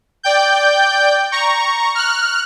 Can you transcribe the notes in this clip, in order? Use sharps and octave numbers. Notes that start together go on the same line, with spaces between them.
D5 G5 G6
A#5 C#6
F6 F#6